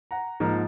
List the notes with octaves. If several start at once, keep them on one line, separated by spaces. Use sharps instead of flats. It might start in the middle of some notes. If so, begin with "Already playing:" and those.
F#5 A#5
G#2 F3 A#3